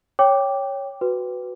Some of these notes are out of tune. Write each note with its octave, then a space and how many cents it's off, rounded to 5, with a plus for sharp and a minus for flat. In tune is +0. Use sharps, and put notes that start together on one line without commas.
C#5 +0 G5 +0 D6 -5
F#4 +0 B4 +10